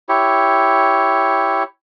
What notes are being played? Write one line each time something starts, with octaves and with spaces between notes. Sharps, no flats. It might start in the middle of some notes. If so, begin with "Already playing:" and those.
E4 G4 C#5